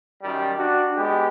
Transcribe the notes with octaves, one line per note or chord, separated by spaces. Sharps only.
F#2 D#3 G3
D4 F#4
G#3 B3 G4